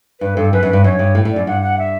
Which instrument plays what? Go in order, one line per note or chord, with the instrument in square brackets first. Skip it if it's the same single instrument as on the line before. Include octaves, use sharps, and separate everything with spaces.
[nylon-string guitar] G2 [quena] B4
[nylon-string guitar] G2 [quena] A4
[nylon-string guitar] F#2 [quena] B4
[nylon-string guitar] F#2
[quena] B4
[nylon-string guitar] G2
[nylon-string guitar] F#2 [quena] C#5
[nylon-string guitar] G2
A2
A2
[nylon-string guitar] F#2 [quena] D5
[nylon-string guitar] G2 [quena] F#5
[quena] F#5
E5